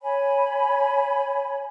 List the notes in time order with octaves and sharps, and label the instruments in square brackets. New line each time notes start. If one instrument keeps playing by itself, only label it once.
[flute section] C#5 G#5 B5